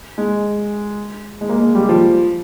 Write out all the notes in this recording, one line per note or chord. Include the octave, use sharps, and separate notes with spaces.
G#3
G#3
A#3
G#3
G3
F3